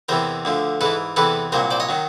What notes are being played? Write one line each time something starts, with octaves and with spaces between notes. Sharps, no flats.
E2 C3 E3 A#4 C5
D2 D3 F3
G#2 E3 A4 B4
E2 C3 E3 A4 B4
C2 A#2 F#3 A#4 C5
C5 D5
C#5 D#5
D#3 F#3